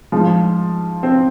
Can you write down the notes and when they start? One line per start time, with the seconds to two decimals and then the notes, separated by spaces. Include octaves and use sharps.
0.12 G#2 F3
1.03 C4